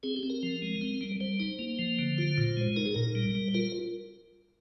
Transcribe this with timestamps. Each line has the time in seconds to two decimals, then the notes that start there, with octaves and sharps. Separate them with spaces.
0.03 C4 G#4
0.16 G4
0.23 C4
0.30 A#4
0.43 F3
0.62 G#3
0.81 C4
1.01 G3
1.21 G3 C5
1.40 D#4
1.59 A#3
1.79 F3
1.99 D3
2.18 F4
2.38 A#2
2.57 G#3
2.76 D#4 A#4
2.86 G#4
2.94 A#2 A#4
3.15 G3
3.35 G3
3.54 F4 A#4